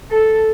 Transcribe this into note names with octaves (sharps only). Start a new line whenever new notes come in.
A4